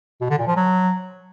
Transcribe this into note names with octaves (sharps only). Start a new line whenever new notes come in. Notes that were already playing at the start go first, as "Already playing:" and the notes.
B2
D3
A#2
F3
F#3